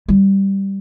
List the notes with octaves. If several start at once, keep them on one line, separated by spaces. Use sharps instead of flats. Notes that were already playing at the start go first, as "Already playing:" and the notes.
G3